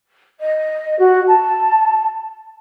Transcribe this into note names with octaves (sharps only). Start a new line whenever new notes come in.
D#5
F#4
A5